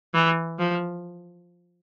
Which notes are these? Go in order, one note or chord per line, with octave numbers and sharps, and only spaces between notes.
E3
F3